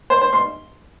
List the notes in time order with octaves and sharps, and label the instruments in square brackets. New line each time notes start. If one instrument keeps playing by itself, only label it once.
[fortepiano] C5
C5
C6